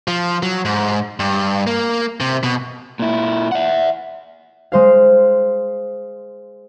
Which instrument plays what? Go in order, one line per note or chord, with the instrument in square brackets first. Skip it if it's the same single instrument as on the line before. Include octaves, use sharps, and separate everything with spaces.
[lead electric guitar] F3
F#3
G#2
G2
A#3
C3
B2
[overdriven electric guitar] A#2 E4
E5 F#5
[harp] G#3 C5 F5